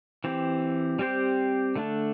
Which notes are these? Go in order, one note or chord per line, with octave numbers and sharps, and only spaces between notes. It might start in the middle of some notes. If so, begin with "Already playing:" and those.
E3 C4 G4
G3 C4 G4 C5
D3 A3 D4